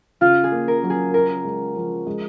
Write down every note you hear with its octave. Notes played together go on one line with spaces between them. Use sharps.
C#3 F4 F5
G#4
A#3
A#4
F#3
G#4
C#4 A#4
G#3
F3
G#3